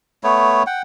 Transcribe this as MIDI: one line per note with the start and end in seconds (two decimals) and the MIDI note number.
0.24 0.63 57
0.24 0.63 59
0.24 0.63 73
0.66 0.82 78
0.66 0.82 79